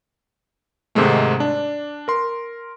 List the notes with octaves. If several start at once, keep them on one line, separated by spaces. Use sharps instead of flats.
G#2 C3 D#3 G#3 A3
D4
A#4 C6